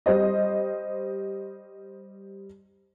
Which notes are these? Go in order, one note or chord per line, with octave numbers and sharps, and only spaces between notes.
G3 C5 D#5